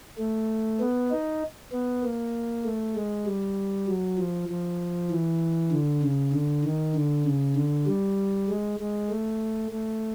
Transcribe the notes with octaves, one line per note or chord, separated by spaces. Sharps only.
A3
B3
D#4
B3
A#3
A3
G#3
G3
F#3
F3
F3
E3
D3
C#3
D3
D#3
D3
C#3
D3
G3
G#3
G#3
A3
A3